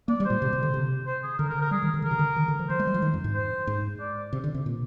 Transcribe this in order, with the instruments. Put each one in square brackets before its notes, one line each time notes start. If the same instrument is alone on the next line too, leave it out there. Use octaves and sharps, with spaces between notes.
[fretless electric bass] A#3 [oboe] D5
[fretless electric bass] G3
[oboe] C5
[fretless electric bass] A#2
C3
C3
D3
C3
[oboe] C5
G#4
[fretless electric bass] D3 [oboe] A#4
[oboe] A#4
A#4
[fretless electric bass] G3 [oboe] G#4
[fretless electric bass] D#3
D#3
[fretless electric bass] D3 [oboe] A#4
[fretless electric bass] C3
D3
D#3
D3
F3
[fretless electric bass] F3 [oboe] C5
[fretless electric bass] G#3
G3
F3
D#3
F2
G#2
[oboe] C5
[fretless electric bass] G#2
[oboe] D5
[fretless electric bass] C3
D3
C3
A#2